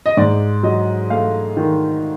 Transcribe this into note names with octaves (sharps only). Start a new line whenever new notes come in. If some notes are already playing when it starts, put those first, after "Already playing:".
D#5
G#2 D5
F#3 D#5
A3 F5
D#3